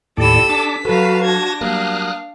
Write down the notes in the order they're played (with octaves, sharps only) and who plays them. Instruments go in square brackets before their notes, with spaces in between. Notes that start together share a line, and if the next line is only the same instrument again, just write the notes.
[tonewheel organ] D#2 A2 D5 [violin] G4 B5 [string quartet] A4 E6
[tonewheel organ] D4 A5 D6 [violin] B6
[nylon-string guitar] F#3 A4 [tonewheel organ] F#4 A5 [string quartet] B4 F5
[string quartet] D4 [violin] G#6 A#6
[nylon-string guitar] F#3 G3 A#3 [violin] F5 [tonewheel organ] D#6 F6 F#6